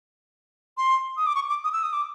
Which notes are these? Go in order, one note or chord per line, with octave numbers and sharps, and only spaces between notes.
C6
D#6
D6
C#6
D6
D#6
E6
D#6
D6